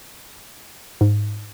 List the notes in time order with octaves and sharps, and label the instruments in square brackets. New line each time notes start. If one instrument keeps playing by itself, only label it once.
[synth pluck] G#2